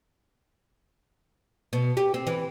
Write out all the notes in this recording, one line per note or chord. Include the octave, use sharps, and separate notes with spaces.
B2
G4
C4
E3